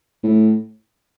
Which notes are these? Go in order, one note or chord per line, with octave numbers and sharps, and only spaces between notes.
A2